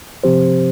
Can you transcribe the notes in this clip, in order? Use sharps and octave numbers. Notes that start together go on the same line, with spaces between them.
C3 F3 C4 G4 C5